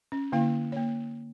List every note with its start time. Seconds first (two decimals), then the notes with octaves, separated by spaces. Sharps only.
0.12 C#4
0.32 D3 A#3 E4 F5
0.72 A#3 C#5